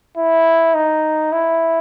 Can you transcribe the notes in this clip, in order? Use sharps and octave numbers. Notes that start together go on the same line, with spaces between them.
E4
D#4
E4